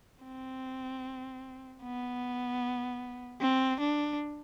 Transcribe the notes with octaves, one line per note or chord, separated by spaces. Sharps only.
C4
B3
C4
D4